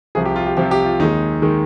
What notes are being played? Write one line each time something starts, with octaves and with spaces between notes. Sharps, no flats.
C2 C3 F3 G#4
G4
F4
G4
C2 C3 F3 G4
G4
F4
D#2 D#3 G#3 D#4
D#3 G#3